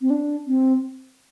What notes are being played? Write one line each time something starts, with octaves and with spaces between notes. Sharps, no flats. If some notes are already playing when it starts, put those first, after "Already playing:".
C4
D4
C4